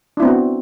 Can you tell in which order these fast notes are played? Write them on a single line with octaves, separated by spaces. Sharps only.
D4 E4 C4 B3 F#4